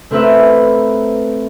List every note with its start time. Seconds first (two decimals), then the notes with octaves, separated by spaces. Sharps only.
0.11 A3 C4 A#4 B4 E5